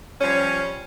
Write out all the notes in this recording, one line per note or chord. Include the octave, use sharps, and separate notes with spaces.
F3 G3 C#4